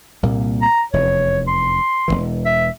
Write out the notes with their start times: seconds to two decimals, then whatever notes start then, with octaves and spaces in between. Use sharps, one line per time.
0.23 C2 A#2 A#3
0.62 A#5
0.93 F1 E2 C#5
1.48 C6
2.08 E1 A#1 E3
2.46 E5